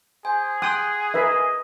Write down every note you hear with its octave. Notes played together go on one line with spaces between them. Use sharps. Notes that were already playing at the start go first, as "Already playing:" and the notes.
G#4 C5 G#5
F#5 G5 C6 D#6 F#6
A#4 B4 D#5 E5